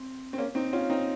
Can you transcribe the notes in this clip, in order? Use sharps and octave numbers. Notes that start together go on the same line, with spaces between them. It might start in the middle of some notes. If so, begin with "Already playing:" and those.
Already playing: C4
C4
A#3 C#4
C4 D#4
C#4 F4
C4 D#4